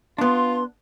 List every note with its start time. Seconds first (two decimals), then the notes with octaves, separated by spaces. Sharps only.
0.18 B3 D4 F4 C6